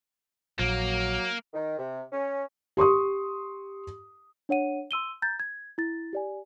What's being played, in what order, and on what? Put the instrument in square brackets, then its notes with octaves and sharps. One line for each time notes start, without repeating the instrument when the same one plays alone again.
[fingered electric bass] A#1 [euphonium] F#3 [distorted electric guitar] A#3
[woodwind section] D#3
C3
C#4
[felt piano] G4 C6 C#6 D#6
[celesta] D4 C#5 F#5 D#7
C6 E6 D#7 G7
A#5 G6 A6
G#6
E4 A6
G4 D5 G#5